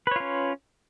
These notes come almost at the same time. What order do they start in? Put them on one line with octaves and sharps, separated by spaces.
B4 C#5 F4 C#4